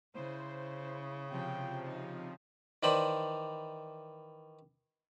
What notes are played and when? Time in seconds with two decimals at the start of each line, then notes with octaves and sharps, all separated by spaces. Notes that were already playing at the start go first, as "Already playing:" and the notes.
0.15 C#3 E4 C5
0.81 E4
1.31 C3 F3 G5
1.87 D#4
2.83 D#3 E3 D#4 C5 D5 B5